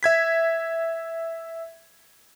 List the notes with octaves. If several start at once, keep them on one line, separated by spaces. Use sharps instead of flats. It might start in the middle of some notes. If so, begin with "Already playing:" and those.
E5 G#6 B6